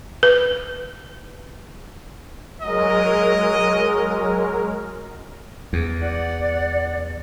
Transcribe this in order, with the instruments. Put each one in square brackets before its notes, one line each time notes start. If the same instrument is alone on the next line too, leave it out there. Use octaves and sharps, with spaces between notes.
[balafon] B4
[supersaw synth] F#3 G#3 A#4 [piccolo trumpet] D#5
[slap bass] E2
[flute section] D5 F#5